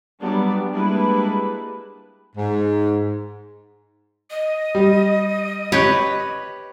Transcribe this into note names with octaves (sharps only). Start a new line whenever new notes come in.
F#3 G3 B3 D4 D5
G3 G#3 A#3 D4 E4 B4
G#2
D#5
G3
G4 B4 C#5